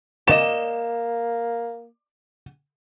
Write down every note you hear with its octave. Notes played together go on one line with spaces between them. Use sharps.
A#3 D5 D#5 E7